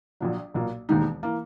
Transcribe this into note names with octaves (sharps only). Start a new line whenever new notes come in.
A#1 A#2 F#3
B1 A#2 A#3
E1 D#2 D#3 G#3 D#4
E3 A#3